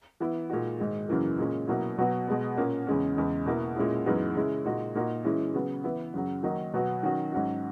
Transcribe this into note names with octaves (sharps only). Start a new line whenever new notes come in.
E3 B3 E4
A#2 G#3 D#4 F#4
G#2 D#3 G#3
F#2 C#3 E3 A#3
A#2 G#3 C#4
B2 F#3 A#3 E4
B2 F#3 B3 F#4
B2 G#3 B3
A#2 A#3 C#4
E2 C#3 G#3 C#4
E2 C#3 G#3
B2 A#3 E4
A#2 G#3 C#4 E4
F#2 E3 G#3 B3 D#4
C#3 G#3 C#4 E4
A#2 G#3 D#4 F#4
A#2 A#3 D#4 F#4
E3 G#3 C#4 E4
C#3 F#3 B3
E3 B3 E4
F#2 C#3 F#3
D#3 F#3 A#3 D#4
B2 F#3 B3 F#4
D#3 F#3 C#4 F#4
G#2 F#3 C#4 F#4